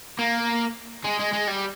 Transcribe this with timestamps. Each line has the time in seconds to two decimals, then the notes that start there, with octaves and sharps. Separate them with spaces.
0.19 A#3
1.04 G#3
1.19 G#3
1.33 G#3
1.47 G3